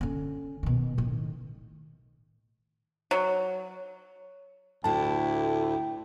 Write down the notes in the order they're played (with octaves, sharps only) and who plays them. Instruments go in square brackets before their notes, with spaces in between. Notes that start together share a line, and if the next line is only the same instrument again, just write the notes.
[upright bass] D3 C#4
B2 D#3
A2 D#3
[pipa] F#3
[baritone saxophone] D2 [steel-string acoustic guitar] A2 E4 [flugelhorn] G5 [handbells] A5